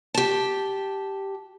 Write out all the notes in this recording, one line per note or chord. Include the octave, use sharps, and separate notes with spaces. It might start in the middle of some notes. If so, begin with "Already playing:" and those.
G4 A5